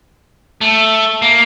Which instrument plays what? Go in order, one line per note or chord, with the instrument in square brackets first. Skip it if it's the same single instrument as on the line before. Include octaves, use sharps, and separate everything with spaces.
[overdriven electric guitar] A3
A#3